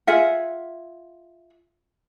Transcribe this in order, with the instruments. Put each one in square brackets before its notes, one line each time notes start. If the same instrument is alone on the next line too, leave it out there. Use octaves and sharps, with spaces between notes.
[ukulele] F4 G#4 E5 F#5